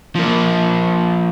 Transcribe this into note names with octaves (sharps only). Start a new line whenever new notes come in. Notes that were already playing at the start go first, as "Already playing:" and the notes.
F3 A#3